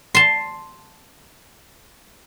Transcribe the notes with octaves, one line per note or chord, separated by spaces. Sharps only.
A5 C6